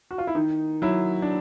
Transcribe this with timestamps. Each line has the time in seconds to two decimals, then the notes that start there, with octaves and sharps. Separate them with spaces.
0.11 F#4
0.18 F4
0.27 E4
0.35 D#3 D#4
0.82 F#3 E4
1.22 D4